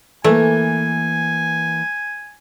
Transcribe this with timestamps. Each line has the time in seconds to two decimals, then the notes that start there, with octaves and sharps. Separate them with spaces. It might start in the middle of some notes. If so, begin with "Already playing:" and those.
0.24 E3 A3 A#3 G#5